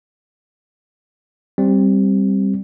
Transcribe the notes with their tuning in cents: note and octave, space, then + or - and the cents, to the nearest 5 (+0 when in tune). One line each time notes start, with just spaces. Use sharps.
G3 +0 C4 +15